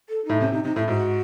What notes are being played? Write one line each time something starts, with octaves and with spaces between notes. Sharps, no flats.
A4
A2 D#4
C3 C#4
C3 D#4
C3 D#4
A2 E4
G#2 F#4